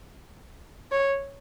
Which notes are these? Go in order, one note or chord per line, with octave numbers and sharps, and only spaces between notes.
C#5